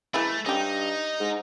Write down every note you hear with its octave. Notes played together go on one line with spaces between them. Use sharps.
E3 G#3 A3 E4
G2 C#4 D#4 G4
G#2